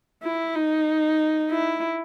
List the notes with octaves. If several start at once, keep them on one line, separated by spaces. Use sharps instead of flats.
E4
D#4
E4